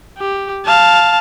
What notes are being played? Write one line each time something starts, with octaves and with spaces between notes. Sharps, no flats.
G4
F5 A5